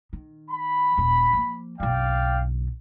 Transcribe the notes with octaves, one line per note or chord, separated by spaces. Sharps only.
D#3
B5
D#1 C#4
F3 A#3
F#1 B1 D5 F5 G5